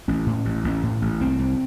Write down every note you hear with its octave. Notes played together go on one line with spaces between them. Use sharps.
A1 C#4
A2
A1
A1
A2
A1
C2 C4
C2